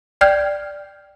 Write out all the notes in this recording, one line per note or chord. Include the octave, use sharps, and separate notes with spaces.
D5 G5 F6 G6 G#6